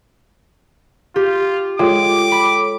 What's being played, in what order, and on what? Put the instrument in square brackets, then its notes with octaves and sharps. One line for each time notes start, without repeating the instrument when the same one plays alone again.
[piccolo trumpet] F4 [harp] G4
[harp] G#3 [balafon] F4 [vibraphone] A4 C#5 G5 [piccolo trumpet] D6
[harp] B5